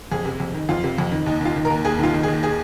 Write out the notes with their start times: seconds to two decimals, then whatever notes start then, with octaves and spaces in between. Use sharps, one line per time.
0.12 F2 G#4
0.25 C3
0.40 F2
0.54 D#3
0.69 F2 F4
0.84 C3
0.98 F2
1.12 D#3
1.26 D#2 D#4
1.41 D#3 F4
1.56 D#3
1.65 A#4
1.70 D#2
1.85 D#2 G#4
1.99 D#3 F4
2.14 D#3
2.23 G#4
2.28 D#2
2.43 G#4